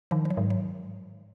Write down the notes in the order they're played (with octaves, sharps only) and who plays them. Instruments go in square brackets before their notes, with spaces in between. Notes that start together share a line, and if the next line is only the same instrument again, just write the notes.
[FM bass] D#3 [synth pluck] F3
[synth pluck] F3
F#3
[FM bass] G#2
[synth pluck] F#3